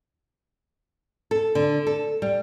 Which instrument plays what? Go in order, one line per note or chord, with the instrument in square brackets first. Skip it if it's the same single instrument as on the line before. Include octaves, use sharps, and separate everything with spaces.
[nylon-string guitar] A4
D3
A4
G3